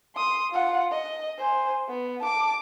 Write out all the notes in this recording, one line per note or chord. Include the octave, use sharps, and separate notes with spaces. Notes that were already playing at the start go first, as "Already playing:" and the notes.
C6 D#6
F4 F#5
D#5
C5 G#5
B3
A5 D6